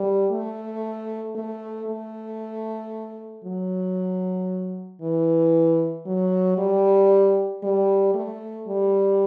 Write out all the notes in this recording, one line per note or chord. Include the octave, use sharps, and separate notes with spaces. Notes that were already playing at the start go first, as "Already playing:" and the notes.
Already playing: G3
A3
A3
A3
F#3
E3
F#3
G3
G3
A3
G3